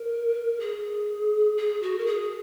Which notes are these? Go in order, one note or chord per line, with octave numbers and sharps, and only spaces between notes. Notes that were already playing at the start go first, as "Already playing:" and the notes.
Already playing: A#4
G#4
G#4
F#4
A#4
G#4